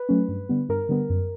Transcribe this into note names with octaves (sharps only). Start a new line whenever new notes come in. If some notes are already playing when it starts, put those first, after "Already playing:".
Already playing: B4
F#3 A3 C#4
G2
D3 G3 B3
G2 A#4
D3 G3 B3
F#2